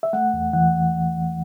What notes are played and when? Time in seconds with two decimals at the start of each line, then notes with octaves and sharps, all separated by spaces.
0.03 E5
0.13 A3 F#5
0.34 E2
0.53 E3 F#5